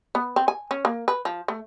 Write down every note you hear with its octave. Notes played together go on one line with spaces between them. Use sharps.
B3
C4
G#5
C#4
A#3
B4
F3
A3